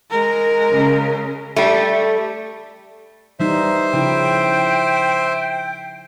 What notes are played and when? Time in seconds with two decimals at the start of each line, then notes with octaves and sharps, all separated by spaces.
0.11 G#3 A#4
0.73 C#3
1.56 G3 A3
3.40 E3 G3 D#4 C5 E5
3.93 C#3 F3 E4 G5